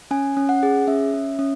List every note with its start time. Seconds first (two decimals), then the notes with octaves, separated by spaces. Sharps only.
0.11 C#4 G#5
0.37 C#4
0.49 F#5
0.63 G#4
0.87 C#4 E5
1.14 C#4
1.39 C#4